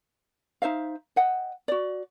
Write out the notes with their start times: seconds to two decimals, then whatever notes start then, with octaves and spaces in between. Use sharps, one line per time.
0.62 D#4 C5 E5 F5
1.16 D#5 F#5 G5
1.68 F#4 D5